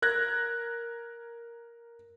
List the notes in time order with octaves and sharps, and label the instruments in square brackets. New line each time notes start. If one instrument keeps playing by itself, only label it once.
[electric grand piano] A#4 F#6 G#6 A#6